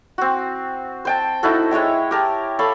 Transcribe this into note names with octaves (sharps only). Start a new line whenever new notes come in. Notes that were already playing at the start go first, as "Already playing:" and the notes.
C4 F#4
C5 G5 A5
D#4 E4 F#4 A4
G#3 C#5 E5 G5
G4 A#4 A5
A4 C#5 F5 B5